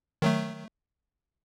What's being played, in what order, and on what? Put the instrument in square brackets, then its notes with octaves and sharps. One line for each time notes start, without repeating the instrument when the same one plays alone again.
[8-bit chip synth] D#3 F#3 A3